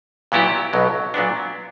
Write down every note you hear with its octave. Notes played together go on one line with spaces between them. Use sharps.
A#2 F#3 B3 E4 G4
B1 B2 F#3
A#2 F#3 B3 D4